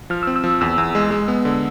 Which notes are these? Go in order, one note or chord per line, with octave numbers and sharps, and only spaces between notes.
F3 F6
E6
C4
E6
F3
E2 E6
E2
G#3
G#3
B3
D3